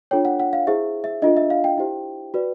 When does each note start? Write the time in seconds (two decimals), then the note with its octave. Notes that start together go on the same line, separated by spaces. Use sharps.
0.11 D4 F4 A4 C#5 G5
0.25 F#5
0.40 F#5
0.53 F5
0.67 E4 G#4 C5 E5
1.04 E5
1.22 D4 F4 A4 D#5
1.37 E5
1.50 F5
1.64 G5
1.77 E4 G4 C5
2.34 F#4 B4 D5